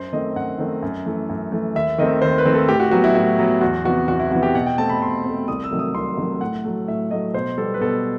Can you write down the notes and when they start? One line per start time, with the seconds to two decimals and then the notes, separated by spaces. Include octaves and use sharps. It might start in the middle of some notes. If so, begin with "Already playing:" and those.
Already playing: F#2 C5
0.13 D#3 A3 C4 D#5
0.36 F#2 F#5
0.59 D#3 A3 C4
0.83 F#2
1.06 E3 A3
1.29 F#2
1.52 E3 A3
1.75 D#2 E5
1.98 D#3 A3 C4 D#5
2.22 D#2 C5
2.38 B4
2.46 D#3 A3 C4
2.54 A4
2.68 A2 G4
2.80 F#4
2.91 F#3 B3 F#4
3.04 E4
3.15 A2 F#4
3.39 F#3 B3
3.61 E2 F#4
3.85 C3 E3 B3 F#4
4.08 E2 F#4
4.19 E4
4.31 C3 E3 B3 F#4
4.43 G4
4.55 B2 F#5
4.66 G5
4.78 A3 C4 A5
4.89 B5
5.02 B2 C6
5.25 A3 C4
5.48 C2 D#6
5.64 E6
5.71 C3 D#3 F#3 A3
5.79 D#6
5.94 C2 C6
6.17 C3 D#3 F#3 A3
6.41 A2 F#5
6.64 F#3 A3
6.88 A2 E5
7.11 F#3 A3 D#5
7.34 B2 C5
7.58 G3 B3 A4
7.74 B4
7.81 B2 A4